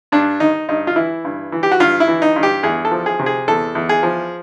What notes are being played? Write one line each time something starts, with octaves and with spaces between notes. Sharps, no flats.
G2 D4
D#3 D#4
G2 D#4
F4
E3 E4
G2
E3
G4
F#4
G2 F4
E4
E3
D#4
G2
G4
E2 G#4
A4
F3
G#4
C3
G#4
E2 A4
E2
G#4
F3